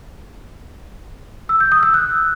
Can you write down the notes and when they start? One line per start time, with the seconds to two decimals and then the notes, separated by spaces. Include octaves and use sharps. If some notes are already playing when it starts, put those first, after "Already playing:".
1.49 E6
1.60 G6
1.72 D#6
1.83 E6
1.94 F#6